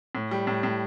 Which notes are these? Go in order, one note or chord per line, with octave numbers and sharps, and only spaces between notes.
A2
G3
A2
A2